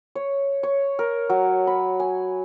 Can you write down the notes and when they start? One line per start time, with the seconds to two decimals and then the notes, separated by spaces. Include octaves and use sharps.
0.15 C#5
0.63 C#5
0.99 A#4
1.30 F#3
1.67 B5
2.00 G#5